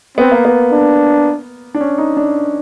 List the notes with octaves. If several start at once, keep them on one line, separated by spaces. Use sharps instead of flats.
B3 C4
A#3
B3
D4
D4
C#4
D#4
D4